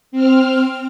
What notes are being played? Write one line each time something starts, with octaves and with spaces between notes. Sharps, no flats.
C4 F6